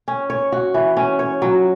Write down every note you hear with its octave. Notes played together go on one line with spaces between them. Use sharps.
C#4
C#5
F#4
E3
C#4
C#5
F#3